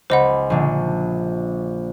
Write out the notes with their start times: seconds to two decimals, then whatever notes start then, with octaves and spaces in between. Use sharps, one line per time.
0.10 C#2 C5 D#5 F#5 B5
0.50 A#1 D3